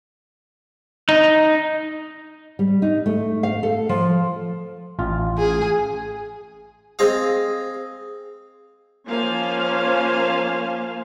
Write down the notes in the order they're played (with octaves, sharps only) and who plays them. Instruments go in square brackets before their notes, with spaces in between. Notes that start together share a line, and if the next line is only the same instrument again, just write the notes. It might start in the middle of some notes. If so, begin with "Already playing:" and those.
[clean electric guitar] D#4
[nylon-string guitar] G3
D#4
A3
F5
A4
F3
[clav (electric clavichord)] A1 F4
[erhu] G#4
[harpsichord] C4 G#4 D#5 F5
[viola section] F3 A#3 C#4 C5 F5 G#5